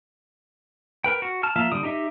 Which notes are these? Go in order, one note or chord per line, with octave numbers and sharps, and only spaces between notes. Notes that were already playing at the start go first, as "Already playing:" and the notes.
A#4 B4 G5
F#4
A5 F6
F3 A#3 F4 E5 F5
D3 G3 D#6
D#4 G4 D#5 E5